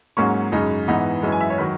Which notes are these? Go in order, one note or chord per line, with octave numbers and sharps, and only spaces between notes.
G#2 F#3 A#3 C#4 C#6
F#2 C#3 G#3 D#4
G#2 E3 B3 D#4
F#2 E3 G#3
G#5
E5
C#5
D#3 F#3 B4